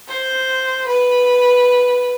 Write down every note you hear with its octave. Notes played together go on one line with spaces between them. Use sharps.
C5
B4